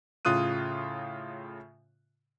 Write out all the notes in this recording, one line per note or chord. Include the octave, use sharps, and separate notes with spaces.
A2 C#3 F4 D#6 F#6 D#7